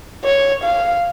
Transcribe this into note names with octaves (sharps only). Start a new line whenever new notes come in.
C#5
F5